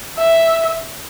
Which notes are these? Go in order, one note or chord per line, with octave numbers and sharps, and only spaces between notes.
E5